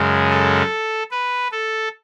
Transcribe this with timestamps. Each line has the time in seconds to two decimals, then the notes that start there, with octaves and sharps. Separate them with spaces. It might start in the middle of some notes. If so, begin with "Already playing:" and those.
Already playing: F#2 C#3 G#3
0.30 A4
1.11 B4
1.52 A4